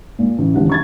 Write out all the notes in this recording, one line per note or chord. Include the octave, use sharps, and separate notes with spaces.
A#2
A1
D#1 D3 E3 F#5
C#6 G#6 A6